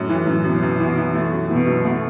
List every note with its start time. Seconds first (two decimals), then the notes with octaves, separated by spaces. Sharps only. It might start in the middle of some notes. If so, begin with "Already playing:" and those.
Already playing: F#2 A2
0.09 E3
0.26 F#2
0.44 F#2 B2
0.63 F#2
0.80 E3
0.98 E3
1.15 A3
1.32 F#2
1.49 B2 E3
1.66 F#2
1.84 A3